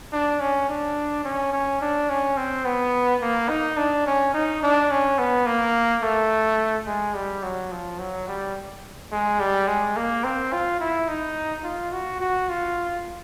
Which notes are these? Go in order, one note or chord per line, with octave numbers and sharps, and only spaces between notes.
D4
C#4
D4
C#4
C#4
D4
C#4
C4
B3
A#3
D#4
D4
C#4
D#4
D4
C#4
B3
A#3
A3
G#3
G3
F#3
F3
F#3
G3
G#3
G3
G#3
A#3
C4
F4
E4
D#4
F4
F#4
F#4
F4